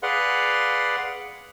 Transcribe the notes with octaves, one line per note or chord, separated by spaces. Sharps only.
G#4 B4 D5 F5 F#5 C6